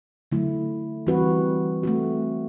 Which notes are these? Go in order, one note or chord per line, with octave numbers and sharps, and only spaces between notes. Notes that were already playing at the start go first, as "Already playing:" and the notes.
D3 F#3 A3 E4
E3 G3 C4 F#4 B4
A3 C4 F#4